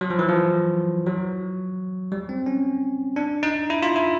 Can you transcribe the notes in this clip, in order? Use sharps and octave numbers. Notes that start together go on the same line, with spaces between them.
F#3
F3
E3
F3
F#3
G3
C4
C#4
D4
D#4
E4
F4
E4